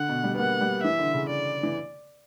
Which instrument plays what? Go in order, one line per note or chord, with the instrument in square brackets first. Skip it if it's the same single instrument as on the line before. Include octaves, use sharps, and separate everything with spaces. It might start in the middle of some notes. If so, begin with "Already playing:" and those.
Already playing: [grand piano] D3 [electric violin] F#5
[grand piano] B2
G3
B3
[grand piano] A#3 [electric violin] F#5
[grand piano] G3
[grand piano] E3 [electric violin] E5
[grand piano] D3
C#3
[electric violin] D5
[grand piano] E3